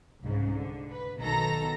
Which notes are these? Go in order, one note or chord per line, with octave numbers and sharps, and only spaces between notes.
C2 G#2 C#3
D3
B4
B1 B2 D#3 A4 A#5 A#6